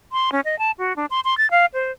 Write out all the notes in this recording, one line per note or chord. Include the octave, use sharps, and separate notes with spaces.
C6
C#4
D#5
A5
F#4
D4
C6
C6
A6
F5
C5